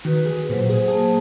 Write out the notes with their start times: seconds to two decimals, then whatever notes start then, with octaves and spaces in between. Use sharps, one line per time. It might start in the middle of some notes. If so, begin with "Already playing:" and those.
0.05 D#3 F#4 B4
0.26 G#4
0.49 A#2 F#3 C5
0.69 G#4
0.88 A#3 G#4 A5